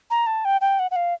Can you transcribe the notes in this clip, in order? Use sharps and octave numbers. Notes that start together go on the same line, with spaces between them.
A#5
A5
G5
G5
F#5
F#5
F5